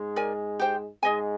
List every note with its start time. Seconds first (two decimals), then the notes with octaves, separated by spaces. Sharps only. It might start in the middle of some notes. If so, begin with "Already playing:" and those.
Already playing: G#2 G#3
0.16 A#4 D5 G#5
0.60 G4 C5 G5
1.03 G#2 G#3 G#4 D#5 G#5